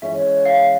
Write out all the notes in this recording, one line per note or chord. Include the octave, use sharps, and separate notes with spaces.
E3 G#3 C#4 E5
F5